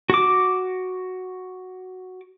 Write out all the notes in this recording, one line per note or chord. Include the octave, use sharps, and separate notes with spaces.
F#4 D6